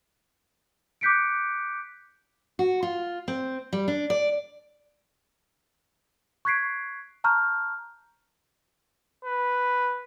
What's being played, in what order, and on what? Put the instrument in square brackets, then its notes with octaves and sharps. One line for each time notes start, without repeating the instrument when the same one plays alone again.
[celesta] D6 F#6 G6 B6 C#7 D7
[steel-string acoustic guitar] F#4
F4
C4
G3
D4
D5
[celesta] C#6 F#6 G#6 B6 C7 D7
A5 A#5 C#6 F6 G6
[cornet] B4